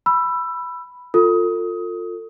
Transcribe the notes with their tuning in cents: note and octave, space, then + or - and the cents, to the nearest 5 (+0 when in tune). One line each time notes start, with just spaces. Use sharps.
B5 +0 E6 +20
F4 +20 A4 +35 D#6 +20